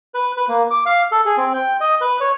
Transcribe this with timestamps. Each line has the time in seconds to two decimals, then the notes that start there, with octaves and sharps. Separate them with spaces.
0.14 B4
0.37 B4
0.49 A#3
0.71 D6
0.86 F5
1.12 A4
1.26 G#4
1.37 C4
1.54 G5
1.80 D#5
2.01 B4
2.21 C#5